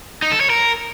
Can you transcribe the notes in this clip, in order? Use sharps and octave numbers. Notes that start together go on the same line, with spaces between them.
D#4
A4
C#5
A#4